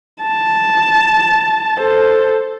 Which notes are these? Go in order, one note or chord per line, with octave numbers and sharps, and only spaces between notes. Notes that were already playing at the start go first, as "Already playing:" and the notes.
A5
A4 C5